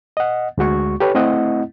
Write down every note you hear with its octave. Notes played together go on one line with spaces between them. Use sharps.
D#5 F#5
D2 G#3 F#4 C#6
G4 A4 B4 C#5
A3 C4 E4 D#5 F#5